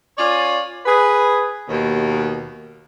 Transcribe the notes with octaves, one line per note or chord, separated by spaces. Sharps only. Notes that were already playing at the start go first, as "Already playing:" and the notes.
C#4 F4 C#5 D5
G#4 B4
D#2 B2